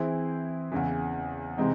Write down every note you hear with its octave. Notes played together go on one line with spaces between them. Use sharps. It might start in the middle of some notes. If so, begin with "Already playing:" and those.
Already playing: E3 C4 E4 G#4 C5
E2 C#3 E3
C3 E3 G#3 C4 D#4